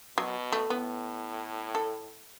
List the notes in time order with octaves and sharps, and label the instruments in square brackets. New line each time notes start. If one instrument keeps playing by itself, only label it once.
[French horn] B2 [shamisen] F#3
[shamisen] A3
[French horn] A2 [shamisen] B3
[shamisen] A4